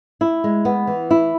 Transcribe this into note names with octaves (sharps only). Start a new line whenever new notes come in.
E4
G#3
B3
E3
E4